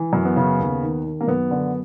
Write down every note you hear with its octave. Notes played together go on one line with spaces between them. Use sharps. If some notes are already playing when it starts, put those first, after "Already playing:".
Already playing: E3
F#2
B3
C#3
D#2
D#3
D#3
A#3
F#2 B3
D3